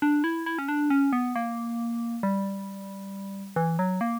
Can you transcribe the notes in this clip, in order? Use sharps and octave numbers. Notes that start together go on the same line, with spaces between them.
D4
E4
E4
C#4
D4
C#4
B3
A#3
G3
E3
F#3
A#3